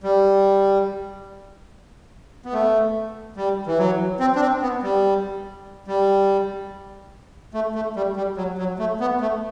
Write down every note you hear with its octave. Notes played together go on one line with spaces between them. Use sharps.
G3
B3
A3
G3
E3
F#3
C4
D4
C4
B3
G3
G3
A3
A3
G3
G3
F#3
F#3
A3
B3
A3